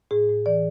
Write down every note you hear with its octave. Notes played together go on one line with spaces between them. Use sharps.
A2 G#4
A2
E3 D5